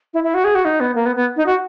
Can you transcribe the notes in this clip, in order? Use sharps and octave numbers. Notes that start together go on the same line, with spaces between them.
E4
E4
F#4
G#4
F#4
D#4
B3
A#3
B3
B3
D#4
F#4